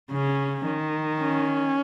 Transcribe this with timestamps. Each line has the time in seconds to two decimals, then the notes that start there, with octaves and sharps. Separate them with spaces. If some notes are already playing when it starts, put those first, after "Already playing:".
0.11 C#3 C#4
0.66 D#3
1.20 C#4